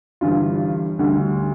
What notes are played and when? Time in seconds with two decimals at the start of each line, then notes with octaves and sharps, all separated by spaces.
0.21 G1 G2 E3 G3 F4
0.99 D2 D3 G3